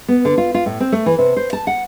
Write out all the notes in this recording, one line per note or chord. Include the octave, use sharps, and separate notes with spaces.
B3
D3
F4
F4
A2
C4
A3
E3
C3
C5
A5
F#5